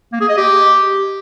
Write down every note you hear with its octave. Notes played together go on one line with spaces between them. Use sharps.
A#3
G#4
D#5
G4